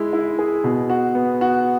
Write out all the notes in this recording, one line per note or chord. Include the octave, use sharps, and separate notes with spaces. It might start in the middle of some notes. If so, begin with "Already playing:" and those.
Already playing: G#3 E4
E4
G#4
B2
F#4
B3
F#4